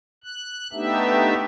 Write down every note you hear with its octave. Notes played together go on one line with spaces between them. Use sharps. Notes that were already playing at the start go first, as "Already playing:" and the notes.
F#6
A3 B3 D4 D#4 G4 E5